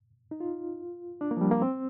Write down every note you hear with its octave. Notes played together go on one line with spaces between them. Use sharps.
D#4
F4
D4
A#3
F3
G3
A#3
C4